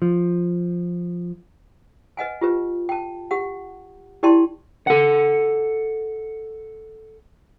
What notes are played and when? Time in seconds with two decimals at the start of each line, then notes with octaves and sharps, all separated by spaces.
0.02 F3
2.17 B4 D#5 F#5 G#5
2.41 F4 G4 B4
2.89 G5 A5
3.31 G4 F#5
4.23 E4 G4 D5 G5 A5 C6
4.87 A4 F#5